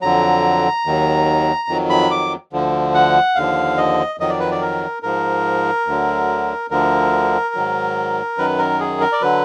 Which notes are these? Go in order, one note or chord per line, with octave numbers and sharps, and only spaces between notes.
F2 D3 F#3 A#5
D#2 D#3 F#3
F2 D#3 F#3
B5
D6
D2 D3 F3
F#5
D#2 D3 F3 F5
D#5
F2 D#3 F#3 D#5
D5
B4
D5
A#4
G#2 F3 A#4
D2 D3 F#3
D2 D3 F3 A#4
G#2 D#3 F#3
F#2 D#3 F#3 B4
A#4
G#4
A#4
D5
D3 F#3 B4